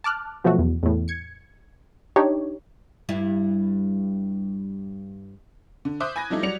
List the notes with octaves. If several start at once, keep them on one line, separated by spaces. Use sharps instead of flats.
A5 D6 F6 F#6
B2 F3 F#3 A3 F#4
E2
E2 A2
G#6 C#7
D4 D#4 G4 C#5
G2 G3 E4
D3
C5 E5 D6 D#6 F#6 G6
G#5 B5 G#6 A#6
F3 G3 A3 D#4 E4
F#3 G3 D5 C#7 F7